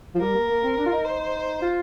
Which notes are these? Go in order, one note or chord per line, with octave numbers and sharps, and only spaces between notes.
F3
G3 A#4
A#3
A#3
C4
D4
F4
D#4
C5
F4